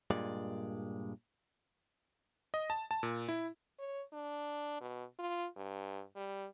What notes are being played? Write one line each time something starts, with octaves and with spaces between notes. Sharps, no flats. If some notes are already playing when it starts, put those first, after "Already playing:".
G2 A#2 G#3 D5
D#5
A5
A5
A#2
E4
C#5
D4
B2
F4
G2
G3